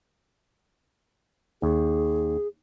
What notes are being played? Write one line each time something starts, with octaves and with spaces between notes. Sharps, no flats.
D#2 G#4